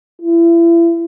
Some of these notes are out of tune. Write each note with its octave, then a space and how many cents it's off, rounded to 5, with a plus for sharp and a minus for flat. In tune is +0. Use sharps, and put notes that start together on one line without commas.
E4 +35